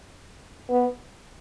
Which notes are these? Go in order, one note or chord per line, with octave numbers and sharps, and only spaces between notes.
B3